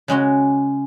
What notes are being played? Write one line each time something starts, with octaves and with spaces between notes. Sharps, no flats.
C#3 G#3 C#4 F#4